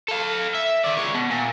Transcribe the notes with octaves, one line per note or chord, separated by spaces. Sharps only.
A4 F5
E5
D#3 D5
G#3 C#5
B2
A#2